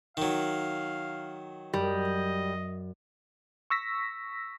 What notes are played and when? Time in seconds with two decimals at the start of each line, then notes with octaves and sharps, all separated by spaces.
0.17 D#3 F#3 F5
1.74 F#2 G3 D#5
3.70 C#6 E6 A#6 B6